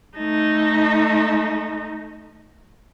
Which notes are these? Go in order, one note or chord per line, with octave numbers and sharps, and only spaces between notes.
A3 D#4